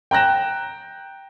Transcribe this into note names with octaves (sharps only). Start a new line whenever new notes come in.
G5 A#5 F#6 A#6 E7